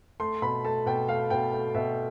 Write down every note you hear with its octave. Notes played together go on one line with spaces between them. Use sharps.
A3 C6
B2 B5
A3 A5
B2 G5
A3 F5
B2 G5
A3
B2 E5